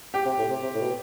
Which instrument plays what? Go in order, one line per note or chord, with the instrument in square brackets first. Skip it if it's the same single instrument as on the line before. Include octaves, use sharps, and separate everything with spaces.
[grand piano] G4
[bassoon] C3
A2
C3
C3
A2
B2